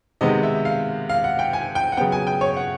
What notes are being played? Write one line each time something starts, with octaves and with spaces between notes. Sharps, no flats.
C3 D#3 G#3 B3 D#5
E5
F5
F5
F#5
G5
G#5
G5
F#5
C#3 F#3 B3 G5
G#5
G5
C#5
F#5